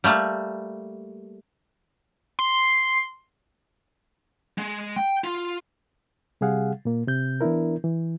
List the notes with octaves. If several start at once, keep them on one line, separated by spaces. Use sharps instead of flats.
G3 A3 A#3
C6
G#3
G5
F4
C3 G3 G#4 F5 F#5
A#2 A#3
C3 G6
E3 B3 D4 E4 A#4
E3